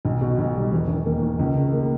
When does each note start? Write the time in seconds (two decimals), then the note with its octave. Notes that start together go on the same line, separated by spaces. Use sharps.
0.05 B1
0.21 B2
0.38 B1
0.55 G3
0.72 E1
0.88 D#2
1.06 A#3
1.22 D#3
1.39 C#2
1.56 C#3
1.73 A#3